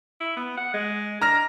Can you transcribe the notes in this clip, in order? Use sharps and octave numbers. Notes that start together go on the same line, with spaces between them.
E4
B3
F#5
G#3
D4 A#5 F6 A#6